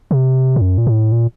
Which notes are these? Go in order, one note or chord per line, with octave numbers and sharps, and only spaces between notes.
C3
A2
F#2
A#2
A2
A#2